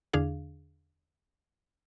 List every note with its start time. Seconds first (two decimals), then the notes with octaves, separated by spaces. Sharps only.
0.13 E2 D3 D4 G#4 F5